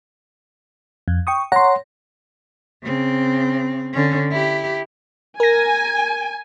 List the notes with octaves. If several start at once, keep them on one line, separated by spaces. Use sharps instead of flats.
F2
G5 C#6 D#6
C#5 F#5 A#5 C6 A#6
C#3 C4
D3 C#4
E4 G4
A#4 G#5 A#6